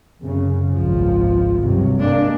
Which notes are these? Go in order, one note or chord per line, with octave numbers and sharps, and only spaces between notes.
F#2 C#3
G#1 C#2 F3
G2 C3 F#3
G#3 A#3 D4